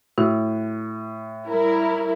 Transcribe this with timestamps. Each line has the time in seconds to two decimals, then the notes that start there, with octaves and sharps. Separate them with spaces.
0.18 A2 F#4
1.48 G3 E4 A#4